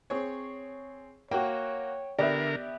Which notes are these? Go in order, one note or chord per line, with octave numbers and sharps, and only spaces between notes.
C4 G#4 C#5
A#3 F#4 C#5 G5
D3 B3 G4 A#4 D5 E5